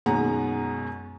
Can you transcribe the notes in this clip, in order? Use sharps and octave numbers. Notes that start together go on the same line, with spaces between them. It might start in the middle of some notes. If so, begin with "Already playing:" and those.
F#2 B2 D#3 G#3 F#5 A#5